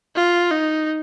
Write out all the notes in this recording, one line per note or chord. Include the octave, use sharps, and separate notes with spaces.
F4
D#4